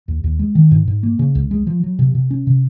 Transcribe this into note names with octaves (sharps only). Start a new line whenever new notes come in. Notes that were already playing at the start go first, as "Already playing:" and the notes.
D#2
D#2
G#3
D#3
G#2
G#2
A#3
C#3
C#2
G#3
F3
F#3
C3
C3
C#4
C3